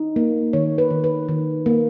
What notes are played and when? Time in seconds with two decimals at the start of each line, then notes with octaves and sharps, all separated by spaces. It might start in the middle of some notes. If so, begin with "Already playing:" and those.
Already playing: D#4
0.16 A#3
0.53 D#3 C#5
0.78 B4
0.90 D#3
1.04 B4
1.29 D#3
1.66 A#3